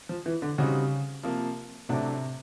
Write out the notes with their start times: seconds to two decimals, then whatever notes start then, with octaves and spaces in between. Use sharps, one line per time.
0.09 F3
0.26 E3
0.42 D3
0.58 C#3 G3 C4 D#4 F#4
1.23 C3 F3 A#3
1.89 A2 C3 F#3 A3 D4 F#4